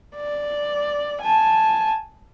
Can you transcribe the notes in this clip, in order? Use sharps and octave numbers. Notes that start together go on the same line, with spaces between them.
D5
G#5 A5